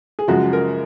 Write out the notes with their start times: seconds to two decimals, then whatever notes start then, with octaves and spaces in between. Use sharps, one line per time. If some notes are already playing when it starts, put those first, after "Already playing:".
0.19 G#4
0.28 F#2 C#3 F3 G#3 F#4
0.53 A#4